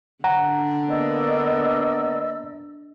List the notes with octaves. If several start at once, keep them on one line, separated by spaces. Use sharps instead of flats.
D3 D4 F#5 A#5
A#3 B3 D5 D#5 E6